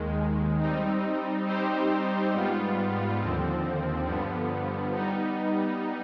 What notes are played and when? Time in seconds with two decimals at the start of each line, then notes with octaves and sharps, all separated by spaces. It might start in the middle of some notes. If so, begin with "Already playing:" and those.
Already playing: D#2 D#3 G#3
0.59 G3 C4 D#4
1.46 G3 C4 D#4 G4 C5
2.33 G#2 G3 B3 F4
3.19 D#2 D3 F3 C4
4.06 G2 D3 F3 B3
4.94 G3 B3 D#4